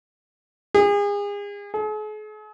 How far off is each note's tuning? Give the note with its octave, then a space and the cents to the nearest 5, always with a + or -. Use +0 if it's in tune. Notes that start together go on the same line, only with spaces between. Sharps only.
G#4 -35
G#4 +45